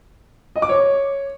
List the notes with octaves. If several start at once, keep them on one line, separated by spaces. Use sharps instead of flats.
D#5
D6
C#5